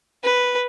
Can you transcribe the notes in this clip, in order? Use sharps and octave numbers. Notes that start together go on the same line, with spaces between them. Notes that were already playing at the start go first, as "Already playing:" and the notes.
B4